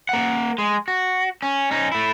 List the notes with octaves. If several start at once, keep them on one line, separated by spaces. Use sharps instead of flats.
A#3 F#5
G#3
F#4
C#4
C#4 D#4
A3 E4